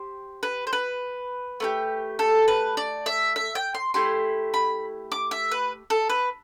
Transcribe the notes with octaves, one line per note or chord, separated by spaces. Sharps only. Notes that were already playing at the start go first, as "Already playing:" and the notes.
Already playing: G4 C5
B4
C5
B4
A3 D4 G4
A4
B4
D5
E5
E5
G5
C6
A3 E4 G4 C6
B5
D6
E5
B4
A4
B4